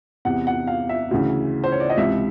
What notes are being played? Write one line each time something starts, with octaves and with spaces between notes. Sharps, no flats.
E2 C3 E3 F#5
F#5
F5
E5
D2 C#3 E3
C5
C#5
D5
D#5
C#2 C3 E3 E5